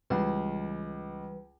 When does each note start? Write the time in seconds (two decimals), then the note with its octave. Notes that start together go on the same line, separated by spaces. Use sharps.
0.10 C#2 E3 G3 B4